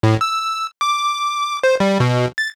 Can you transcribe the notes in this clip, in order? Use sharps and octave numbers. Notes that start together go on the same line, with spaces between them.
A2
E6
D6
C5
G3
B2
A6